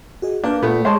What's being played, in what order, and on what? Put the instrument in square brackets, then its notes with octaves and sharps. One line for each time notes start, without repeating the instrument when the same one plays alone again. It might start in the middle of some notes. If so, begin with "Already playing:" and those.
[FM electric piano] F#4 G#4 D#5
[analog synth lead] A#3 [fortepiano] D4 [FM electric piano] B4 G6
[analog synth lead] A#2 [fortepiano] A3 B3
[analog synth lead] G#3 [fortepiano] C5 C#5 A5